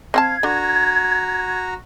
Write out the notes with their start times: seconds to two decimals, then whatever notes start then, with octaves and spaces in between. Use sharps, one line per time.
0.14 C4 F5 F#5 A5 G#6
0.43 D3 F#4 A#5